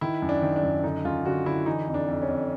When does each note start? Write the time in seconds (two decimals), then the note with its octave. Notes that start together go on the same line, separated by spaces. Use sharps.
0.01 D#3 E4
0.22 F#2
0.29 D4
0.42 D#3
0.56 D4
0.63 F#2
0.83 D3 D#4
1.05 F#2 F4
1.25 D3 F#4
1.46 D3 E4
1.66 E3 D#4
1.88 F2
1.94 D4
2.08 F2
2.22 C#4
2.28 F2